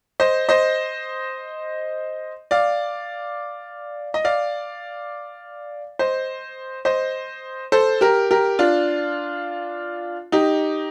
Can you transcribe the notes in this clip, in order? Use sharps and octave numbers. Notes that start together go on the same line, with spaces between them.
C5 D#5
C5 D#5
D5 F5
D#5
D5 F5
C5 D#5
C5 D#5
A4 C5
G4 A#4
G4 A#4
D4 F4
D#4 G4